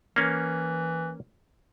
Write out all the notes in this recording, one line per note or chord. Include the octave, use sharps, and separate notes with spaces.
E3 A#3 C#4